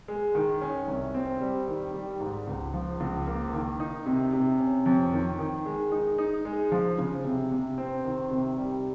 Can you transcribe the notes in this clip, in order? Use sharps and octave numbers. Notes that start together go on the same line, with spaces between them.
G#3
D#3
C#4
C2
C4
G3
D#3
G3
G#2
C#2
F3
C#2
A#3
D#3
D#4
C3
C3
C#4
F2
D#3
D#3
G#3
D#4
D#4
G#3
F3
C#3
C3
C3
C4
D#3
C3
G3